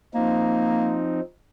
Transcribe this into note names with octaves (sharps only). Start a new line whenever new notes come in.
F3 A#3 C4 D#4